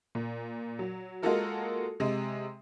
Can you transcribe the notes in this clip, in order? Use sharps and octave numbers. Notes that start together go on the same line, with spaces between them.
A#2
F#3
G#3 A#3 F4 F#4 A4 A#4
C3 G#3